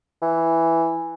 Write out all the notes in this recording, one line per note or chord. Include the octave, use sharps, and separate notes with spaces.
E3